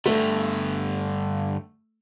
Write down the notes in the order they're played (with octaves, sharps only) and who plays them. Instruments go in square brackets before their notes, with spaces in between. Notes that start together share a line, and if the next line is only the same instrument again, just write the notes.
[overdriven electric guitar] G2 D3 [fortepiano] A3